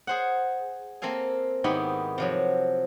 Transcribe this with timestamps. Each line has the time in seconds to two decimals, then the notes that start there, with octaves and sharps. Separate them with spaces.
0.07 G#4 C5 F#5
1.02 A#3 C4 A4 F5 G#5
1.64 G#2 D#3 B3 E4 G4 B5
2.18 C3 F3 F#3